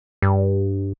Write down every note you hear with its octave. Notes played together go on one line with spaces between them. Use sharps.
G2